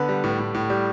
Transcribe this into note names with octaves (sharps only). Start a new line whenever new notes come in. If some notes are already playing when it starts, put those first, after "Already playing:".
Already playing: D3 B3 B4
G3
A2
A2
A2
G3